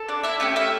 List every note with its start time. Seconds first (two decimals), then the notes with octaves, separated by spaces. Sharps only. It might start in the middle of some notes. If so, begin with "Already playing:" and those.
Already playing: A4
0.08 D4 D5
0.23 E4 E5
0.40 A3 C#4 G4 E5
0.56 E4 E5